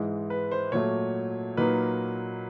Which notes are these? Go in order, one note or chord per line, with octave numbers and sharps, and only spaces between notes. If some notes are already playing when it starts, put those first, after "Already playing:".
Already playing: G#2 E3 G#3
B4
C5
A#2 F#3 A3 C#5
A#2 F#3 A#3 D#4 B4